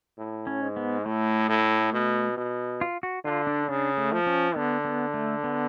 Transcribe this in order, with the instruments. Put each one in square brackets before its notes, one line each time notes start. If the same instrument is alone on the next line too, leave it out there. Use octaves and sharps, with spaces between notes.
[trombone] A2
[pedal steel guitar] C#4
[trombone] G#2
[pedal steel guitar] B3
[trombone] A2 [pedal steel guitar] A3
[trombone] A2
B2
B2
[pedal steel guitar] F4
F#4
[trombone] D3 [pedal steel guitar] F4
[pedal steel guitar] D4
[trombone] C#3 [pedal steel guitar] D4
[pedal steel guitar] A3
[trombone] F3
[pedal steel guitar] C#4
[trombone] D3 [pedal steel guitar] B3
[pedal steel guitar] B3
A3
B3